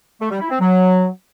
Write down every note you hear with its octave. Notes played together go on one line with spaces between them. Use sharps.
A3
G3
E4
C4
F#3